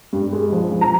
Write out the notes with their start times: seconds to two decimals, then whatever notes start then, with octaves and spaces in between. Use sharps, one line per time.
0.13 G2
0.33 G#3
0.52 F3
0.71 F3
0.81 A#5